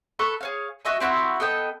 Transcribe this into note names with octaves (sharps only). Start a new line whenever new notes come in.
A4 B4 C#6
G#4 C#5 F5
F#4 D#5 E5 G#5
C4 E4 F#4 E6
B3 A4 D#5 G5